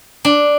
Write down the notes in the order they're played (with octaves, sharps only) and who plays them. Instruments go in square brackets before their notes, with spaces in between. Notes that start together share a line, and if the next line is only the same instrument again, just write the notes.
[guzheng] D4